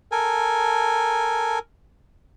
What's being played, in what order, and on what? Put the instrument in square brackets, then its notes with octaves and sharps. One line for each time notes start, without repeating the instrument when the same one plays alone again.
[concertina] A4 A#4 G#5